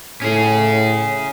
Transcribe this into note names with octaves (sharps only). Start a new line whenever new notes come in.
A2 C#4 G#4